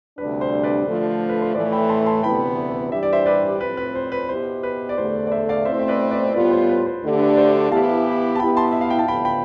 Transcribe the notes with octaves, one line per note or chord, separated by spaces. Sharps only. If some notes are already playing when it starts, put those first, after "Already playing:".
D2 C3 G3 D4 B4
C5
B4 D5
D3 F3 A3
B4
C5
A2 E3 A3 B4 D5
G5 B5
A5 C6
A5 C6
D2 C3 E3 B3 E4 G5 B5
G2 E3 G3 D4 G4 E5
D5
C5 E5
B4 D5
A2 F3 C4 B4
B4
C5
B4
B2 B3 E4 G4 C5
B4
D5
E2 D3 A3 C5
D5
C5 E5
D5 F5
B2 A3 C4 E4 C5 E5
E5
B4 D5
B4 D5
A2 G3 B3 F4 B4 D5
C5
B4
C5
D2 D3 A3 D4 G4
B4
C5
C5
E3 B3 E4 G4 F5 A5
A5
B2 B3 E4 G4 G5 B5
A5 C6
E5
F5
G5
A5
D2 D3 F3 B3 G5 B5
G5 B5